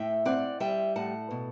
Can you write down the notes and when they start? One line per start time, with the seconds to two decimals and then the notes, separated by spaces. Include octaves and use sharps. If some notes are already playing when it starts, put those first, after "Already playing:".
Already playing: A2 E5 G5
0.25 C4 D5 F#5
0.60 G3 E5 G5
0.96 A2 F#5 A5
1.31 B2